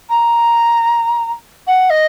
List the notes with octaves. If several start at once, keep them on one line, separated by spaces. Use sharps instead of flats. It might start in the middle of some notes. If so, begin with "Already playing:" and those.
A#5
F#5
D#5